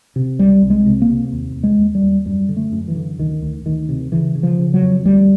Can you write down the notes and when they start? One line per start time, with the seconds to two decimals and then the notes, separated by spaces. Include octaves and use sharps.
0.16 C3
0.39 C2 G3
0.62 C2
0.70 G#3
0.86 C3
1.02 A#3
1.09 C3
1.32 D#2
1.56 D#2
1.64 G#3
1.79 D#2
1.95 G3
2.02 D#2
2.26 F#2 G3
2.49 D3
2.57 A3
2.72 F#2
2.88 E3
2.95 D3
3.19 D2 D#3
3.42 D2
3.65 D2 D#3
3.89 C3
4.12 C#3 E3
4.35 C#3
4.43 F3
4.59 C#3
4.74 F#3
4.82 F2
5.05 D2 G3